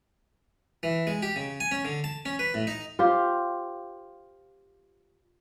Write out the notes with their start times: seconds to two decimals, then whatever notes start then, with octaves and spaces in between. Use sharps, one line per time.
0.83 E3
1.07 G#3
1.22 G4
1.36 C#3
1.60 G#5
1.72 C#4
1.85 D3
2.04 A5
2.26 C#4
2.39 B4
2.54 A2
2.67 D#4
2.99 F4 G4 C5